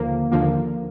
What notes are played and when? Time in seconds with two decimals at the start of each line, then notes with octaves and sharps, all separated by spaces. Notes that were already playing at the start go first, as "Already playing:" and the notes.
Already playing: D#2 D3 F3 A#3
0.32 D#2 D3 F3 A#3